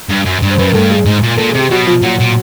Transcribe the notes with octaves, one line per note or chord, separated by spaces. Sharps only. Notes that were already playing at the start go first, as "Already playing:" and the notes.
G2
F#2
G2
C5
F#2 B4
A#4
G2 A3 A4
G#3 G#4
G#2 G#3 G#4
A#2
A#2 A4
G#4
C3 G4
B2 F#3 F#4
F3 F4
A#2 F#3 F#4
A#2